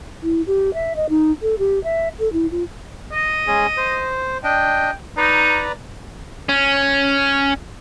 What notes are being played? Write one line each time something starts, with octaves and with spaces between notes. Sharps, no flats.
E4
G4
E5
D#5
D#4
A4
G4
E5
A4
E4
F4
D#5
G#3 C#4 G#4
C5
D4 D#5 G5
D#4 B4 D5 A#5
C#4